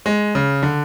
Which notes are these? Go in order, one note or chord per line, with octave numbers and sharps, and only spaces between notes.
G#3
C#3
D3